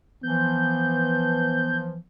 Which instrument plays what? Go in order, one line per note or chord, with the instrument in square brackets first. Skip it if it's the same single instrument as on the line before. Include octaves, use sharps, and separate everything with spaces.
[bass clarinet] E3 [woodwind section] F3 [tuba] B3 [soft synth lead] G6